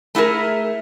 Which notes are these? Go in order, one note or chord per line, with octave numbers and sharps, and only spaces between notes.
A3 E4 G#4 A#4